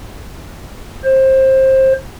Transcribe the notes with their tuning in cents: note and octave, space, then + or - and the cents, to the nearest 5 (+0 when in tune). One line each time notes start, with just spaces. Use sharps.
C5 +20